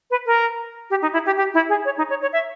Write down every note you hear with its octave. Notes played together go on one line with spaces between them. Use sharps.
B4
A#4
G4
D#4
E4
G4
G4
E4
G#4
C#5
D#4
C#5
C#5
E5